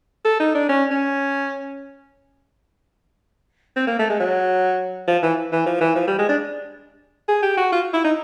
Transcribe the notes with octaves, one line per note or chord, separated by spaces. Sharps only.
A4
D#4
D4
C#4
C#4
C4
A#3
A3
G#3
F#3
F3
E3
E3
F3
E3
F3
G3
G#3
D4
G#4
G4
F#4
F4
E4
D#4